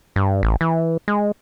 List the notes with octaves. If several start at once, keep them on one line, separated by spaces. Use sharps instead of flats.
G2
A1
E3
G#3